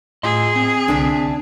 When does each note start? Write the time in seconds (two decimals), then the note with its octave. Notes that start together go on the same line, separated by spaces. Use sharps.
0.23 A2 F4 G#4 D#5 C6
0.56 C4
0.88 C2 D3 D4 E5